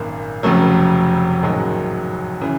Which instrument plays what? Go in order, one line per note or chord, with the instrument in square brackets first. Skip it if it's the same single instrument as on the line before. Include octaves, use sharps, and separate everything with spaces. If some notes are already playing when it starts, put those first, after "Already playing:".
Already playing: [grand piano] G#1 F#2 A#2 D#3 A#3
F1 F2 C#3 F#3 A3
A1 G#2 D#3 F#3 G#3
C#3 E3